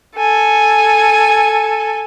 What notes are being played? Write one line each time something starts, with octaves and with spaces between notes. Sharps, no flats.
A4 G#5